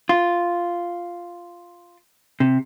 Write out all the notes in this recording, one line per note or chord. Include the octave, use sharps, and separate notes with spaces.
F4
C3